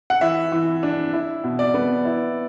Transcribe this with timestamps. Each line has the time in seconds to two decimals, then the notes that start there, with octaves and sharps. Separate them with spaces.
0.10 F#5
0.21 E3 E5
0.52 E3
0.83 D4
1.13 E4
1.44 B2
1.59 D5
1.74 B3
2.05 E4